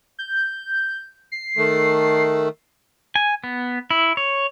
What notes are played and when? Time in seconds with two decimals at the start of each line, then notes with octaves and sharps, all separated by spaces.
0.19 G6
1.32 C7
1.57 D#3 A3
3.16 G#5
3.44 B3
3.91 E4
4.17 C#5